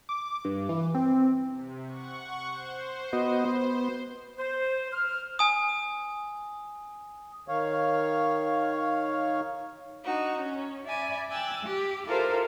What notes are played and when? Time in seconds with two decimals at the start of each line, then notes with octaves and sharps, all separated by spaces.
0.09 D6
0.45 G2
0.69 E3
0.95 C4
1.49 C3
1.86 F#5 C#6
2.49 C5
3.13 B3 F#4 D#5
3.45 B3
4.38 C5
4.92 F6
5.39 G#5 D#6
7.48 D#3 C#5 F5
10.05 D4 D#4 F#4
10.36 C#4
10.86 D5 E5 G#5 B5
11.30 G5 G#5 E6 F#6 A6
11.63 G4
12.06 E4 F4 G4 A4 A#4 C5